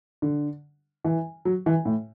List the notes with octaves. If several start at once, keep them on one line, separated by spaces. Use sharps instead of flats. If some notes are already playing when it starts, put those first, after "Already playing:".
D3
E3
F#3
E3
A2